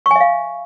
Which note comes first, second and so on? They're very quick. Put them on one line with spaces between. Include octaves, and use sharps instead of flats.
C#6 G#5 E5 F5